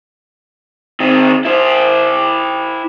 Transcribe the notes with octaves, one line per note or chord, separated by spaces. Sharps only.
D#3 C4
E4 C5